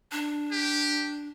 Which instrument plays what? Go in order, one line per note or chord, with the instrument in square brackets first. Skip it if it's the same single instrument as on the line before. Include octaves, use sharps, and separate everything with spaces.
[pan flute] D4
[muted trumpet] G4